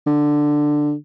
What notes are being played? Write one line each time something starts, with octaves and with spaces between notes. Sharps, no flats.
D3